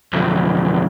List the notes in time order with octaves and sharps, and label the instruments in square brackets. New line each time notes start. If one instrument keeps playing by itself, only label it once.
[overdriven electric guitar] B1 F2